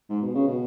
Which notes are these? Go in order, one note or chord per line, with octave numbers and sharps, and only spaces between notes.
G#2
B2
C#3
B2